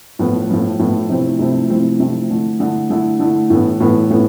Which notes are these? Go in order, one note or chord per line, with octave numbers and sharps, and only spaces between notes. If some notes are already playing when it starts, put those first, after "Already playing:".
A2 F3 B3
A2 F3 B3
A2 F3 B3
C3 F3 A3 C4 E4
C3 F3 A3 C4 E4
C3 F3 A3 C4 E4
C3 F3 A3 C4 E4
D3 A3 E4
D3 A3 E4
D3 A3 E4
D3 A3 E4
A2 E3 B3
A2 E3 B3
A2 E3 B3